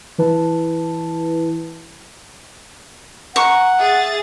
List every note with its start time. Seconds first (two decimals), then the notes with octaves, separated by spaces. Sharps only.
0.18 E3 E4 B4 A5
3.36 F#5 A#5 C#6
3.79 G#4 E5 A6